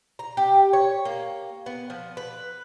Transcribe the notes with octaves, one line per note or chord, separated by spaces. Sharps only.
A#5
G4
C#5
A#3
B3
F3
B4